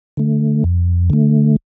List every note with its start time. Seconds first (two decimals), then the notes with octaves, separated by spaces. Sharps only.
0.17 D3 A3
0.64 F2
1.10 D3 A3